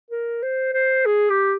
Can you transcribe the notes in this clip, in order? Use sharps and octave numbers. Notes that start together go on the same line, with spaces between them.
A#4
C5
C5
G#4
G4